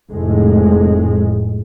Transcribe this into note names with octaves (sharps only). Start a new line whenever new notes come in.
F1 A2 G#3